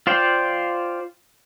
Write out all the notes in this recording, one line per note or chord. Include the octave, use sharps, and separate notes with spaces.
F4 C5 D5 F5 G5